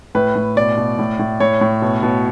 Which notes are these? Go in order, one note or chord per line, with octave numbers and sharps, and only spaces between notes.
A2 B4
A2
B2 D5
B2
A2
A2
A2 C#5
A2
B2
B2